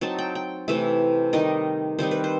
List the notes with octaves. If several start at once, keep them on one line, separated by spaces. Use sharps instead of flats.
F#3 C4 D#4 A5
G5
G5
C3 E3 A3 E4 E5
D#3 G3 D#4 D#5
D#3 G3 C4 D#4 C5
B4
C5